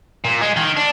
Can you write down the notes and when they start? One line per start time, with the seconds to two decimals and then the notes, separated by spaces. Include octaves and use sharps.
0.25 A#2
0.41 G#3
0.57 D#3
0.77 D4